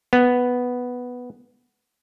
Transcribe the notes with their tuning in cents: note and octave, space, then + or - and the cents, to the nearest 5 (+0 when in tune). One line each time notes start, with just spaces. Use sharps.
B3 +0